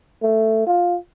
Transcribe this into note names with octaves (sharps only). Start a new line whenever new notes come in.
A3
F4